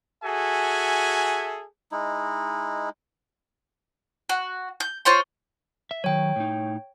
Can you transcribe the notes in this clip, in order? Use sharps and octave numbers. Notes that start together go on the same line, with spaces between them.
F#4 G#4 A4 E5 G#5
G#3 D#4 E4
F#4
G6
F4 C5 C#5 C6
E5
D#3 F#3 C#5 G5
A2 D#4